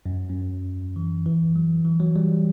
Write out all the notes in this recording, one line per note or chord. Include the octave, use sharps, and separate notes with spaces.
F#2
F#2
E3
E3
F#3
E3
F#3
G3